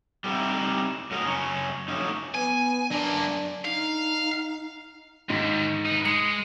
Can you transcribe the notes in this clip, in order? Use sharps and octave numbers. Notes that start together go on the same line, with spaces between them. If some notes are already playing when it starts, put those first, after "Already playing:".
G3 C4 D#4 E4
F#2 F#4 A#4 D#5
F#2 C#3 C#4
F3 F#3 A3 A#3 C#4 D#4
B3 G#5
F#2 A#3 D4
D#4 F5
D#2 G#2
D#4 B4
G#3 C#7